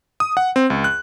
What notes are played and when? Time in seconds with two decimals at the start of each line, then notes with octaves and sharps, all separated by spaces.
0.20 D#6
0.37 F#5
0.56 C4
0.70 C#2
0.84 F#6